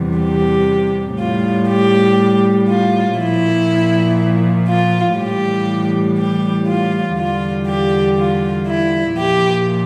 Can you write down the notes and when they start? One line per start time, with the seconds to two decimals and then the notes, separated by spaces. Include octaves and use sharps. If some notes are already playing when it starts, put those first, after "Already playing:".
Already playing: E2 C3 E3 G3
0.18 G4
1.18 A2 G3 F4
1.69 G4
2.68 F4
3.18 A#2 F3 E4
4.68 F4
5.18 A2 E3 G3 G4
6.18 G4
6.68 F4
7.17 E2 D3 G3 F4
7.68 G4
8.18 F4
8.67 E4
9.17 A#2 F3 G4